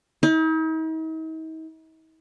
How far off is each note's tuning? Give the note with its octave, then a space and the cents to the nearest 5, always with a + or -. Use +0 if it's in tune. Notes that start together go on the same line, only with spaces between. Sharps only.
D#4 +45